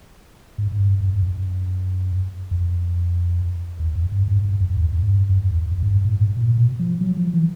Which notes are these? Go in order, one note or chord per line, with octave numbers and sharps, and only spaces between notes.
G#2
G#2
G2
F#2
F#2
F2
E2
F2
G2
G#2
G2
F2
E2
F2
G#2
G2
F#2
E2
F2
G#2
G2
A2
G#2
A#2
B2
F3
F#3
F3
E3